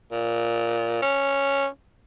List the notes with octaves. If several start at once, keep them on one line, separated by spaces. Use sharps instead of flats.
A#2
C#4